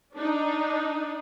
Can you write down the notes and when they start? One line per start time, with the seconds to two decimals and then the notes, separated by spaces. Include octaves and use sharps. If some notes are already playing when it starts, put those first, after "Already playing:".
0.15 D4 D#4